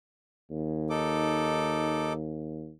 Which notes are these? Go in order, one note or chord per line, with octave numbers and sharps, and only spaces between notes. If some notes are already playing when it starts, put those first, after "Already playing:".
D#2
D#4 A4 D6